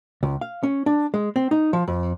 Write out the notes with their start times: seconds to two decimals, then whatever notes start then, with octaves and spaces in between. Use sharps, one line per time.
0.23 C#2
0.41 F5
0.63 C#4
0.86 D4
1.14 G#3
1.36 C4
1.51 D#4
1.73 F3
1.88 F2